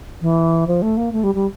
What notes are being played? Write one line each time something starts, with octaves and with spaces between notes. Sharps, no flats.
E3
F3
A3
A#3
A3
G3
G3